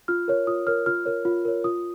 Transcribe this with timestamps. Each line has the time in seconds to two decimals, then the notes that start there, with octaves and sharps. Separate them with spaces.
0.08 F4 F6
0.28 A#4 C#5
0.47 F4 D#6
0.67 A#4 C#5 F6
0.86 F4 F6
1.06 A#4 C#5
1.25 F4
1.45 A#4 C#5
1.64 F4 D#6